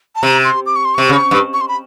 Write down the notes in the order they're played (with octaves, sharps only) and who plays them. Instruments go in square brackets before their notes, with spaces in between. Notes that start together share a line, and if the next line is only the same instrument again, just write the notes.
[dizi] A5
[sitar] C3 [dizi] A#5
[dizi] C6
D6
C#6
C6
[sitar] C3 [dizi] C#6
[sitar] C#3
G2
[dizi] C#6
C6
B5